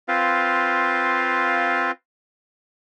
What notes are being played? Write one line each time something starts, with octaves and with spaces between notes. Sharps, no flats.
C4 F4 B4 F5